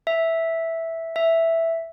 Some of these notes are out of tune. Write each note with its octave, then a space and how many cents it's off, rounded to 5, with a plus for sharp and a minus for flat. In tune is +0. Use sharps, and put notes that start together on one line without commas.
E5 -5
E5 +0